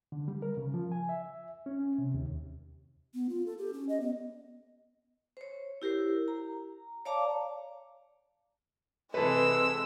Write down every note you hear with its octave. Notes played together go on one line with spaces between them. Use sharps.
D3
G3
A#4
C#3
F3
G#5
E5
C#4
C3
D#2
B3
F4
A4
G4
C#4
D#5
B3
C5 C#5
E4 G4 A#4 C5
A#5
C#5 D5 F5 A5 A#5 D6
C3 E3 G#3 A4 B4 E6